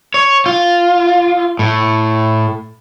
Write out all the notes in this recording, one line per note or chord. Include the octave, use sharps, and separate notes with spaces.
C#5
F4
A2